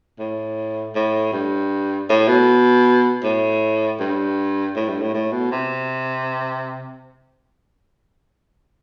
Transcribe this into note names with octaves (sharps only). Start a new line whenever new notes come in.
A2
A2
G2
A2
B2
A2
G2
A2
G2
A2
A2
B2
C3